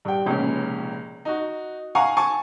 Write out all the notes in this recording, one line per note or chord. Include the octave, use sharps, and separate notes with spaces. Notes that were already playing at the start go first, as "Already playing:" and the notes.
G2 G5
F1 C#2 A#2 C#4
D#4 F#4
F5 F#5 G#5 A#5 C#6
G#5 A5 C#6